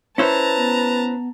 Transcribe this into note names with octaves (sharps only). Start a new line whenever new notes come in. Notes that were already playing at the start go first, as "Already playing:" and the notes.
C#4 E4 B4 C5 A5 A#5
B3